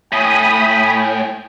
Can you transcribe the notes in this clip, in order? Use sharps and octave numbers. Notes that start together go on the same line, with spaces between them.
A2 G5 G#5 B5 D#6